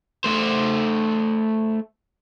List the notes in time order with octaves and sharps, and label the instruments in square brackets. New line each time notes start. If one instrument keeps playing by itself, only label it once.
[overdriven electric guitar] A3 C5